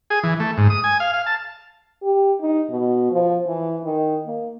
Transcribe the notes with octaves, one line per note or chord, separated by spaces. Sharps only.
G#4
E3
A3
G#2
D#6
G#5
F5
F5
A5
G4
D#4
B2
F3
E3
D#3
A#3